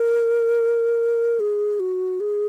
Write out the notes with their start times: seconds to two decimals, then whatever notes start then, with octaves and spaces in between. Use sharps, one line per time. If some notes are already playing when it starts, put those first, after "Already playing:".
Already playing: A#4
1.40 G#4
1.80 F#4
2.20 G#4